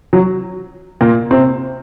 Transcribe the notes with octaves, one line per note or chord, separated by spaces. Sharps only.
F#3
A#2 A#3
C3 C4